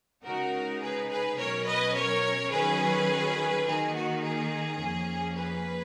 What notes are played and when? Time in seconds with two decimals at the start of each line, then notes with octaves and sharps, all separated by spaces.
0.24 C#3 G#3 D#4 F#4 A#4
0.81 G#4 B4
1.09 G#4 B4
1.38 B2 F#3 C#4 A#4 C#5
1.67 B4 D#5
1.95 A#4 C#5
2.51 D#3 F#3 C#4 G#4 B4
3.65 D#3 A#3 D#4 G#4
3.94 F#4
4.22 G#4
4.79 F2 F3 A#3 C#4
5.35 G#4 B4